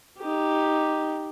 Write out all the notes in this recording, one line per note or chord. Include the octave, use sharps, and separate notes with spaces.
D#4 G4